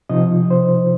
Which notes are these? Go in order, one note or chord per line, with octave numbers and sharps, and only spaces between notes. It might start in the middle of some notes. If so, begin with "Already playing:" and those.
C3 F3 D#4 D#5
C5